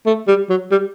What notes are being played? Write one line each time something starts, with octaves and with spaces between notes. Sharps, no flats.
A3
G3
F#3
G3